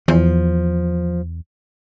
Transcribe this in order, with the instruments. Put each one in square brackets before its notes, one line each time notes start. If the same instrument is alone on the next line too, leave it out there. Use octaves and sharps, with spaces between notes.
[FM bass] E2 [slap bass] F3